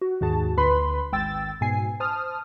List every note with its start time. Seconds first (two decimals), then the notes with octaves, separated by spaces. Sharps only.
0.01 F#4
0.21 D#2 G#2 F#4 G#4 A5
0.57 D2 B4 B5 C6
1.13 G#1 G5 E6 A6
1.61 G#2 B2 G#5 C7
2.00 C5 A5 D#6 F6